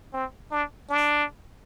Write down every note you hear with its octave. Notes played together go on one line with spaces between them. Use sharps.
C4
D4
D4